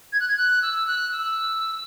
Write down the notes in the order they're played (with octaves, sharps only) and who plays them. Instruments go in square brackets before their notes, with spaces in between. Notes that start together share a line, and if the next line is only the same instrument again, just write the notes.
[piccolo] G#6
F#6
G#6
F#6
E6
F#6
E6